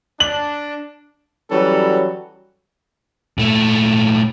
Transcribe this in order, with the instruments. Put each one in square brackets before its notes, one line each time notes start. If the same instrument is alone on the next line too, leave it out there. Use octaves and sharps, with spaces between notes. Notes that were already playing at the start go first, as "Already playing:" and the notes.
[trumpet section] D4 [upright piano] F#7
[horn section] E3 F#3 G3 C#4 F#4 A4
[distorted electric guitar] A#2 A3